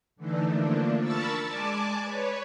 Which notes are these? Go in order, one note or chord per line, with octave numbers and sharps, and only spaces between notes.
D3 E3 A3 D4 D#4
D3 F3 A3 A#3 D4
A#4 A5 B5 C#6 E6 A6
G#3 D5 G#5 A5 D6
B4 C#5